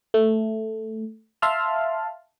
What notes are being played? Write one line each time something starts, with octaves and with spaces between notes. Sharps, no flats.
A3
E5 F5 A5 C6 F6